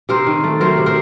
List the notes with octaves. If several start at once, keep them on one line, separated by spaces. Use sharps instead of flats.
C3 A#4 C5
D#3
A3
F#3 A#4 C5
C3
A#4 C5